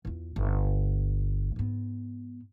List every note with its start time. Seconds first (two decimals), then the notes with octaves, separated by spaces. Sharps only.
0.05 E2 F4
0.36 G1
1.56 G#2 B3